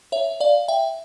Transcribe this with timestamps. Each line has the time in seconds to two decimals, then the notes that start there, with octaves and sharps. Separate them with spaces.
0.12 C#5 E5
0.40 D5 F5
0.68 E5 G5